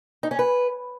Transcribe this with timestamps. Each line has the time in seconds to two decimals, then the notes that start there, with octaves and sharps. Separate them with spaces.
0.23 D#4
0.31 C#4
0.39 B4